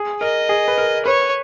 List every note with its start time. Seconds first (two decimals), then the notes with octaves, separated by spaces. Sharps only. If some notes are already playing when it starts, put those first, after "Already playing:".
Already playing: G#4
0.21 A#4 D#5
0.49 G#4
0.68 B4
0.78 A#4
1.05 B4 C#5